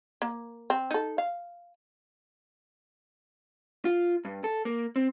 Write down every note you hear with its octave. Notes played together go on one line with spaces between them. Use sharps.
A#3
C4
D#4 A4
F5
F4
G2
A4
A#3
C4